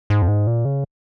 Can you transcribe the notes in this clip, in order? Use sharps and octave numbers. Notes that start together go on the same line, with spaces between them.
G#2
F2
G#2
A#2
C#3